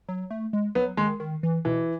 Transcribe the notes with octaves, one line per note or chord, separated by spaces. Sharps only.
F#3
A3
G#3
F#3 B3
D#3 G#3
D#3
E3
B2 E3